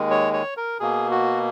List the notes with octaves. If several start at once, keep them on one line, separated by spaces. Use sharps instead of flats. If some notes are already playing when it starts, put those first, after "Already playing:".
Already playing: D#2 D#3 G#3
C#5
C#5
A#4
B2 A#3 G#4
F#4